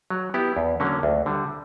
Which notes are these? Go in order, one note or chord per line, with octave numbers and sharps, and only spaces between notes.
F#3
B3 E4 G4
E2
D3 F#3 A#3 C#4
D2
D3 G3